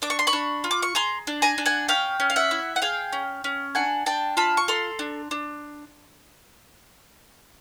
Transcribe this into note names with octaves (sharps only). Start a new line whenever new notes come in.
D4 D6
C#6
C6
B5 C#6
D4
F4
D6
C#6
G#4 A#5 C6
D4
G#5 A#5
D4
F#5 G#5
C#4 F5 G5
C#4
F5
E5 F#5
E4
F#5
G#4 F5 G5
C#4
C#4
D4 F#5 G#5
D4 G5 A5
F4 A5 B5
C#6
A4 A#5 C6
D4
D4